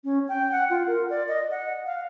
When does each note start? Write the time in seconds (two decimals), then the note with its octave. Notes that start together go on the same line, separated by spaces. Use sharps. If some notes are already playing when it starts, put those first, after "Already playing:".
0.04 C#4
0.29 G5
0.52 F#5
0.70 F4
0.87 A#4
1.10 D5
1.28 D#5
1.51 F#5
1.86 F5